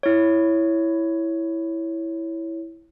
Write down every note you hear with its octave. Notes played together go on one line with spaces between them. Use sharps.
E4 C#5